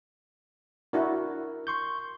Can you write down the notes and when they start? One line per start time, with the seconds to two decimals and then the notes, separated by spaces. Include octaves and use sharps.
0.93 D4 E4 F#4 A#4
1.67 C6 C#6 G6